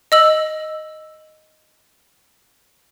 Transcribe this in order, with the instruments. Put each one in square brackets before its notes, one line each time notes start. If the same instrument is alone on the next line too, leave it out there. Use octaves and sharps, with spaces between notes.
[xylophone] D#5 E6 F#7